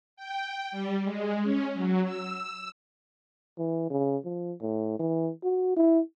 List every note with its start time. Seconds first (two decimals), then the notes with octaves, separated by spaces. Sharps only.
0.17 G5
0.71 G3
1.03 G#3
1.43 C#4
1.74 F#3
2.05 E6
3.58 E3
3.90 C#3
4.25 F3
4.62 A2
4.99 E3
5.44 F#4
5.77 E4